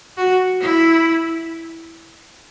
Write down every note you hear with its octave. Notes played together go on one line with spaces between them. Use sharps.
F#4
E4